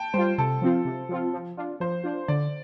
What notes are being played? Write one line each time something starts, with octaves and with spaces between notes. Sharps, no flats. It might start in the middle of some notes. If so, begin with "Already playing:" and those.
Already playing: G5 A5
G3 F4 C5
C3 A4
F3 C4 F4
C3
F3 C4 F4
F3
D4 F4
F3 C5
D4 F4
D3 D5